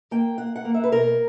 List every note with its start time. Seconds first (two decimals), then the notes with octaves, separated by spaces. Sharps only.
0.11 A#3 G5
0.38 A#3 F#5
0.56 F#5
0.65 A#3
0.74 E5
0.84 B4
0.92 B2 A#4